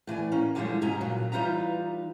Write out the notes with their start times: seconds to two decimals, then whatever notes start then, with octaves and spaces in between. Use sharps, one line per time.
0.07 A2 E3 D5 G#5
0.32 A#3 C#4
0.55 A2 D3 E3 F3 G3 G#3
0.81 G#2 B2 C#4 D#5 G#5 A#5
1.01 G2 A#2 C#3 F#3
1.32 E3 G3 D#4 F4 B4 A#5